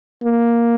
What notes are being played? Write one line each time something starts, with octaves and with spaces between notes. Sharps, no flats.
A#3